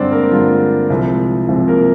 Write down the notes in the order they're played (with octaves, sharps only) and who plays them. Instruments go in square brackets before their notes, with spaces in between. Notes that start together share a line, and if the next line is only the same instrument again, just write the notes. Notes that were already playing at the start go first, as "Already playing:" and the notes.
Already playing: [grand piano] G2 D3 G#3 C4 D4 C5 D5
A#3 A#4
G2 D3 G#3 F4
C2 C3 F3 G#3
C2 C3 F3 G#3
A#3 A#4